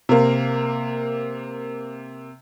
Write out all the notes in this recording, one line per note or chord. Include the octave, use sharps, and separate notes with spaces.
C3 A#3